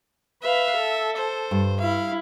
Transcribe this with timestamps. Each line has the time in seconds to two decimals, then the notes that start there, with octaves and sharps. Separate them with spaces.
0.43 B4 E5 F5
0.77 A4
1.16 C5
1.51 G2
1.80 E4 F5